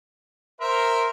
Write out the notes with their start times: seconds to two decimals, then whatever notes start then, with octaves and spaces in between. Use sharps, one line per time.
0.61 A#4 C5 E5 C6